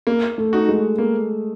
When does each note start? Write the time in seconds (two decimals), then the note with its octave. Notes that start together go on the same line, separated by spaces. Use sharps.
0.07 A#3
0.38 A3
0.53 D#4 F#4
0.69 G#3
0.98 A#3